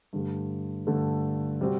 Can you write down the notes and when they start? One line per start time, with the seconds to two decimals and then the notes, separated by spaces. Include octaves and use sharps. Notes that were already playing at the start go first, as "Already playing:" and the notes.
0.13 G2 D3 A3
0.87 G2 D3 A3
1.61 C3 G3 C4 F#4